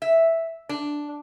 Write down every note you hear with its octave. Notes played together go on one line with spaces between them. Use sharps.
E5
D4